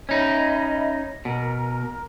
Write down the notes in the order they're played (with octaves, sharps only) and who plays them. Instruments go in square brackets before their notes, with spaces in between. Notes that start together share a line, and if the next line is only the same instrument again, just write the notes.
[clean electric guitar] C#4 D#4 [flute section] D#5 E5 B5
[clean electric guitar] B2 [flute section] A#4 A#5